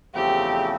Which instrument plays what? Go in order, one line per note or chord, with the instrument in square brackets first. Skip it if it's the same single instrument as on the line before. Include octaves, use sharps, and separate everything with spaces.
[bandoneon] E2 C#3 F3 A3 C4 [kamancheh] G4